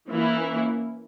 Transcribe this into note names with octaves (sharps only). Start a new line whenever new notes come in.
E3 A#3 C#4 E4